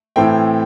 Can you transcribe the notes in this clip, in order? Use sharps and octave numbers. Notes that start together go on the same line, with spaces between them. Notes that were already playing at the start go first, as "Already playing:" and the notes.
A2 E3 A3 C4 G5